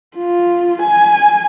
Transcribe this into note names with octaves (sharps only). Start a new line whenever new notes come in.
F4
G#5